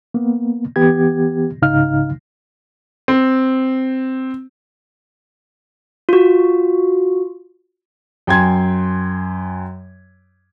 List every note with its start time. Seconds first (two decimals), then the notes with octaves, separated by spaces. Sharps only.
0.14 A#3 B3
0.76 E3 B3 G4 G#6
1.62 C2 G#2 C#3 D#4 F5 F6
3.08 C4
6.09 F4 F#4
8.27 F#2 G5 G#5 C6 G#6